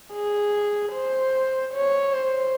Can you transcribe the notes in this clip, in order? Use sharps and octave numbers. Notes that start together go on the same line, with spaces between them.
G#4
C5
C#5
C5